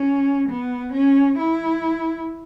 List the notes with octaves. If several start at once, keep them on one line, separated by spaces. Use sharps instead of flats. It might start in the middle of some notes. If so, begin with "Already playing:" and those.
Already playing: C#4
B3
C#4
E4